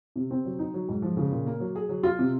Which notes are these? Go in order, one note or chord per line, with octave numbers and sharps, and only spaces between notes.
C3
C4
F#3
D#4
F#3
G#2
F3
C#3
A#2
A#3
F#3
G#4
F#3
F4
C3